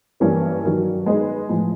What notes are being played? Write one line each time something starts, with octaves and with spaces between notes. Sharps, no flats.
G2 E3 G3 A#3 C#4
G2 D#3 F#3
G#3 B3 D#4 G#4 B4
A2 F3 G#3